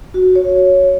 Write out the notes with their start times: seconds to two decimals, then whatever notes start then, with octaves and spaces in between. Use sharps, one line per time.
0.14 F#4
0.36 C#5